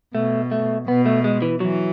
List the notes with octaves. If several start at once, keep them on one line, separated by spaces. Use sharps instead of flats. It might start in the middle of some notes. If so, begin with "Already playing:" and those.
B2 A3
A3
B2 B3
A3
G#3
E3
E3 F#3